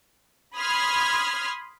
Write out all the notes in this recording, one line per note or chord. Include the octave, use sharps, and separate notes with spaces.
B5 C6 D#6 F6 G#6